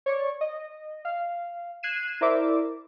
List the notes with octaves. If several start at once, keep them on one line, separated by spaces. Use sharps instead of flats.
C#5 D5 C#6
D#5
F5
F#6 G#6 C7 D#7 E7
E4 A#4 C5 D5 E5 D6